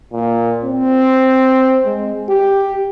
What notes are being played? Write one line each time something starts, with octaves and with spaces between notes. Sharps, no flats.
A#2
C4
G#3
G4